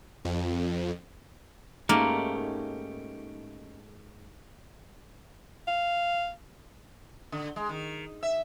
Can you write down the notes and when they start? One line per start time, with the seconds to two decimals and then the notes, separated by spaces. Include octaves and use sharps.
0.25 F2
1.89 G#2 A3 A#3 C#4 D#4 G4
5.67 F5
7.32 D3
7.56 G#3
7.69 D#3
8.23 E5